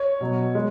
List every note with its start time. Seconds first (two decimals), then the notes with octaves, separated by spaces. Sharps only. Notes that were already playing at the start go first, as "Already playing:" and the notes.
Already playing: C#5
0.21 B2 F#3
0.55 G#3